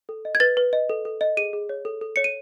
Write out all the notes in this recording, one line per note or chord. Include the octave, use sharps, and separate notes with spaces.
A4
D#5
G#6
B4 A6
B4
D#5
A4
A4
D#5
G#4 D#7
G#4
C#5
A4
A4
C#5 C#7
D#7